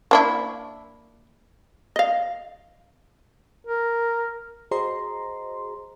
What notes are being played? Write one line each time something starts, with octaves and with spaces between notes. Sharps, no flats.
A#3 D4 E4
D#5 F5
A#4
F#4 G#4 C5 D#5 A#5 C6